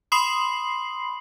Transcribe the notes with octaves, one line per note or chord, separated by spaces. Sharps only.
B5 C6 D#6 C7 F#7